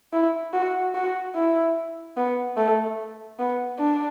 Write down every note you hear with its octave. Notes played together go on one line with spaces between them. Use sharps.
E4
F#4
F#4
E4
B3
A3
B3
D4